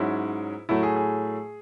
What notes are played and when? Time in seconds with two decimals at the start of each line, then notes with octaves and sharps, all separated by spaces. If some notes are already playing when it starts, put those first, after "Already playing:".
Already playing: G#2 F#3 C#4 E4
0.69 A2 F#3 A3 E4
0.83 G#4
0.96 G#4